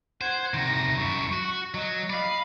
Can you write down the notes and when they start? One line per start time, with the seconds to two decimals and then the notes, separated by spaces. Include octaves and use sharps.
0.21 C5 F#5 G#6
0.54 C3 D#3 A#6
0.99 F#2 E4 C#6
1.33 F#4
1.74 F#3 D#5
2.10 D5 D#5 F5 B5